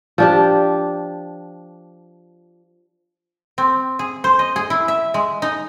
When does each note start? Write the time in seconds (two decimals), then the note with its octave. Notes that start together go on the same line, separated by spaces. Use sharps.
0.18 F3 D4 G4
3.58 C4
3.99 G#4
4.24 C5
4.39 D#5
4.56 G#4
4.70 E4
4.88 E5
5.14 G#3
5.42 D#4